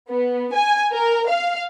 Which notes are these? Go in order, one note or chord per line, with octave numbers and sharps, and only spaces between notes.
B3
G#5
A#4
F5